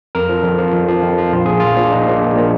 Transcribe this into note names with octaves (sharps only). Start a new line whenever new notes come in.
F2 A#4
F3
F2
F3
F2
F3
F2
F3
A#1 F4
A#2 F3 G#4
A#1 F4
A#2 F3
A#1 D#4
A#2 F3
A#1
A#2 F3